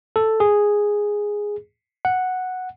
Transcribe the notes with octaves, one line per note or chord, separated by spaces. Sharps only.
A4
G#4
F#5